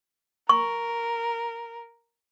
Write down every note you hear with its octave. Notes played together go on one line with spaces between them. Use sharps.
A#4 C#6